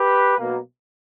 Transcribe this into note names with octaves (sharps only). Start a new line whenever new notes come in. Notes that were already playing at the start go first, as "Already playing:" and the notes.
Already playing: G4 B4
B1 B2 A#3